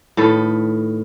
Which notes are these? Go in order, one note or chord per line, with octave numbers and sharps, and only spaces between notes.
A2 D#3 A4 B4